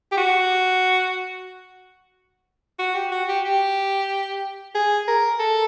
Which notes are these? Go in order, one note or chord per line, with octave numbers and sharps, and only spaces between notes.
G4
F#4
F#4
G4
F#4
G4
G4
G#4
A#4
A4